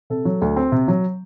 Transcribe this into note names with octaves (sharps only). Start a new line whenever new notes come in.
C3 A4
F#3
D2
C4
C3
F#3